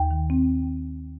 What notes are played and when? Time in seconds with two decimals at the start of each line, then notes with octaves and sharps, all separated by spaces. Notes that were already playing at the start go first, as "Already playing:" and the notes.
Already playing: D#2 G5
0.11 D#3
0.30 C4